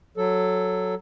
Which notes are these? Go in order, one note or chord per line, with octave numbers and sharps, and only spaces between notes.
F#3 A4